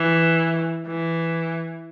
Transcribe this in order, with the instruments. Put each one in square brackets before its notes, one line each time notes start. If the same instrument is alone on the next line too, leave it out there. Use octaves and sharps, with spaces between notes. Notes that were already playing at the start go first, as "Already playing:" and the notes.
Already playing: [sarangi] E3
E3